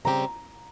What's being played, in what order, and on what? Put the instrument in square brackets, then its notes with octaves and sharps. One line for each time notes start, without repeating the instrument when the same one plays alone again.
[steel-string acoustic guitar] C#3 G3 C4 G4 [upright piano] A#5